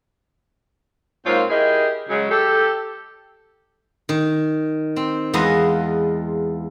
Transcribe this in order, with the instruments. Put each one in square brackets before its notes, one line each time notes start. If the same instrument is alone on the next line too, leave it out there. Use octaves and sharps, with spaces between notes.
[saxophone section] G#2 A#3 C4 F4 C5 C#5
E4 G4 G#4 A#4 D#5
C#3 F#3 G#3
G4 A4
[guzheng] D#3
C4
E2 G#3 F4 B4 D#5 A#5